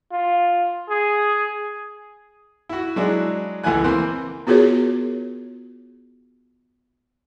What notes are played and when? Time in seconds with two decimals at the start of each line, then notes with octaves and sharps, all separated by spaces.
0.12 F4
0.89 G#4
2.69 E4 F#4
2.96 F#3 G#3 D4 E4
3.64 C#2 E3 A3 E4 G#5 F#6
3.84 E3 A#3 C4 C6
4.47 B3 F4 F#4 G#4 A#4 C#5